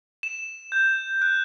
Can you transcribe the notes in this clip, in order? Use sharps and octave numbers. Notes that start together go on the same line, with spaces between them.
E7
G6
F#6